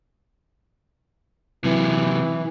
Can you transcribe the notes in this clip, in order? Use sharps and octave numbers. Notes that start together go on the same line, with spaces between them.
C3 E3 F#3